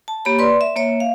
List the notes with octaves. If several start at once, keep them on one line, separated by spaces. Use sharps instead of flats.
A5
A#3 G4 C#5 B5
B4 D5 C6
E5
A#3 C#5 E5
F5